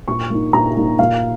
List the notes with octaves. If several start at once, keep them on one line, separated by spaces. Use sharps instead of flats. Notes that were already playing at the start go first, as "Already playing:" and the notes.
A#2 C#6
A#3 D#4
A#2 A#5
A#3 D#4
A#2 F5